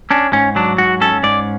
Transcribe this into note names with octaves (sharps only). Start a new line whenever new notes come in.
C#4 D4
G#2 C#4
F#3 D4
G#2 F#4
C#4 A4
G#2 D5